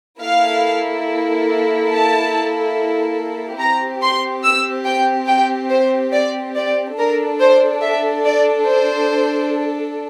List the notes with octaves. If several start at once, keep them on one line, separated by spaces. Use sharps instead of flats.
A#3 E4 A4 F5
A5
C4 G4 A#5
C6
E6
G5
G5
C5
D5
D5
D4 A4 A#4
C5
E5
D5
C5